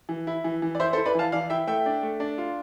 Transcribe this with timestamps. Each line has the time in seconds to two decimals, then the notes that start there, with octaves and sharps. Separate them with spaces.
0.09 E3
0.27 E4
0.44 E3
0.62 E3
0.75 D5
0.80 E4 C5 E5
0.93 A4 C5
0.98 E4
1.06 B4 D5
1.15 E3 F5 A5
1.32 E3 D5 F5
1.50 E4 E5 G5
1.67 A3 E5 G5
1.86 D4
2.03 A3
2.20 D4
2.38 F4